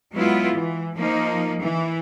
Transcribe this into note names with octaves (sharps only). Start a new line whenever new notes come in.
F#3 G#3 B3 E4 F4
E3
F3 A#3 D#4
E3